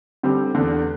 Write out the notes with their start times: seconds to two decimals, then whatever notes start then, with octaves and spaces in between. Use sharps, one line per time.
0.23 D3 G3 C4 G4
0.55 E2 D3 A3